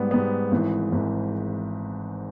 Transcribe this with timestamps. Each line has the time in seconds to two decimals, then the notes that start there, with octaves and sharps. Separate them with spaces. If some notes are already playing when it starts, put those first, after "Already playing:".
Already playing: G#2 G3 B3
0.11 G#2 G3 B3
0.51 G#1 G#2 E3
0.92 G#1 G#2 E3